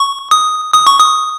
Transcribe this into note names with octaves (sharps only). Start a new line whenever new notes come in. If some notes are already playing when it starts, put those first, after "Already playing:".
Already playing: C#6
D#6
D#6
C#6
D#6